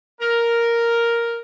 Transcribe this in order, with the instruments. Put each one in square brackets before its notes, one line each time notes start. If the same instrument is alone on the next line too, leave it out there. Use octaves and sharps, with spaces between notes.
[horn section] A#4